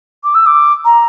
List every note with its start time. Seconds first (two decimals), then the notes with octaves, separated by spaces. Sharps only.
0.24 D6
0.34 E6
0.46 D6
0.85 A#5